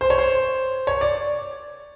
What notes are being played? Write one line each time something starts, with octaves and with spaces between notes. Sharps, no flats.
C5
C#5
C5
C#5
D5